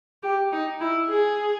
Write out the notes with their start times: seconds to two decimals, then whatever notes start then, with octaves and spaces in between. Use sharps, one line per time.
0.23 G4
0.52 D#4
0.81 E4
1.09 G#4